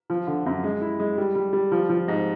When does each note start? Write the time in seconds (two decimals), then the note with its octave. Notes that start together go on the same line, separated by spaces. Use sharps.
0.10 F3
0.27 D3
0.46 F#2
0.64 G#3
0.81 E4
1.00 G#3
1.18 G3
1.35 G3
1.53 G3
1.72 F3
1.89 F3
2.08 G#2